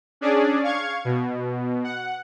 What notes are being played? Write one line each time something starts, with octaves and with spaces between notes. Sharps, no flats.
C#4 D4 G#4 D5
F5 C#6 G#6
B2
F#5